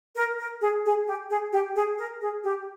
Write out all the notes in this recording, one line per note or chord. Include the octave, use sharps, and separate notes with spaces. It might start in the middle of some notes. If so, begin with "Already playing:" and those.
A#4
A#4
G#4
G#4
G4
G#4
G4
G#4
A#4
G#4
G4